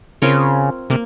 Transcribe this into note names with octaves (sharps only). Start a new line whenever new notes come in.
C#3 C4 F4 A#4 C#5
C3 A#3